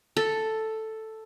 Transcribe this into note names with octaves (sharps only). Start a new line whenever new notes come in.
A4